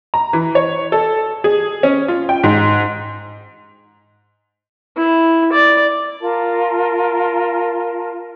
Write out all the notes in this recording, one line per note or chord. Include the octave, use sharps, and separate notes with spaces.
A#5
E3
C#5
A4
G#4
C#4
F4
G5
G#2
E4
D5
F4 A#4 A5